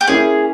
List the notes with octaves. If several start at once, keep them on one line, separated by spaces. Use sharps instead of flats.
G4
A#3 C#4 E4 G#4